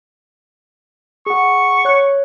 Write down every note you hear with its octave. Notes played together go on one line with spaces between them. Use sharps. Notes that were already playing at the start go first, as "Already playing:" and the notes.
G#4 F#5 C#6
C#5 F#6